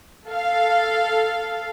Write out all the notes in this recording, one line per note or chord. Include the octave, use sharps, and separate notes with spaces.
A4 F5